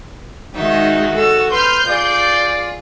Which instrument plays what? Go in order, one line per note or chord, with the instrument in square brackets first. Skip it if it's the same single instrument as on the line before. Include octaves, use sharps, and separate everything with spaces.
[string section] D#3 G#3 [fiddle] D#4 E5 [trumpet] F#4
[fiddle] A4 E6
[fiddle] B4 F6 [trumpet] C6 [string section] G6
[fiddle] F4 G#4 [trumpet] D5